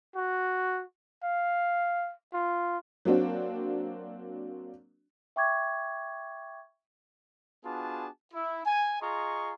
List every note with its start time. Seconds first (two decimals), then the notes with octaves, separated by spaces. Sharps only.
0.16 F#4
1.23 F5
2.33 F4
3.05 F#3 A#3 C4 D4 F#4
5.36 E5 G5 C#6 D6 G#6
7.65 B3 D4 F4 F#4 G#4 A5
8.33 E4
8.66 G#5
9.01 F4 G#4 D#5 A#5 C6 C#6